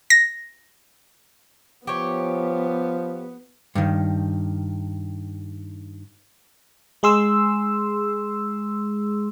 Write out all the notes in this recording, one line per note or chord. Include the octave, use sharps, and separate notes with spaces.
A#6
F3 B3 G4 C#5
G2 D#3
G#3 G#4 C6 E6